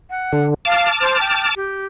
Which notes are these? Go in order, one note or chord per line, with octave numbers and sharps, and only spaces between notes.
F#5
D3
F5 A5 D6 F6
C5
G5
G4